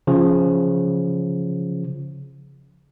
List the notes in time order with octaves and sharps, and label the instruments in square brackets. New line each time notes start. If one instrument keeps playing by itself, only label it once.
[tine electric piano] C#3 F3